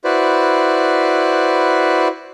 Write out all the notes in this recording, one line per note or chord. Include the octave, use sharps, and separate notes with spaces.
E4 F#4 B4 C5 D5